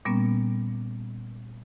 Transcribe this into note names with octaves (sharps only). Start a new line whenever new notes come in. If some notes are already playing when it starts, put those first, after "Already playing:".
A#2 G3 A#3 B3 C#4